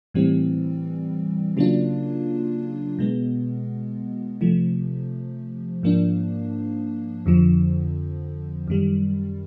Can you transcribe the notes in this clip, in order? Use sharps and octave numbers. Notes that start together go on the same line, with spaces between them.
A2 E3 G3 C4
C#3 F#3 A#3 D4 F4
B2 G#3 B3
C3 F3 A3
G#2 F3 A#3 D4
F2 D3 F3
F#2 D#3 G3